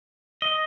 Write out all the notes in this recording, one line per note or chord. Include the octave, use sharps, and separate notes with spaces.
D#5